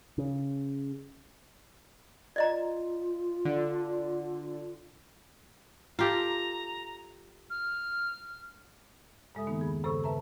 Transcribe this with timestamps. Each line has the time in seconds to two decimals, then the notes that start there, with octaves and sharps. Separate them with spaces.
0.18 C#3
2.36 F4 D5 D#5 A#5
3.45 D3
5.99 F4 G4 A4 A#5
7.50 F6
9.35 G2 C#3 G#3 A4 E5 D#6
9.47 D#3 A#3 B3 D#4
9.59 E2 G#4 B5
9.84 G2 C#3 A4 C5 C#6 E6
10.04 B4 E5 A5 A#5